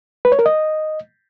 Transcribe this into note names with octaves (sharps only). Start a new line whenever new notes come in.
B4
C#5
A#4
D#5